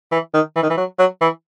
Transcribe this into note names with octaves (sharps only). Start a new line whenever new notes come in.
E3
D#3
E3
D#3
E3
F#3
F#3
E3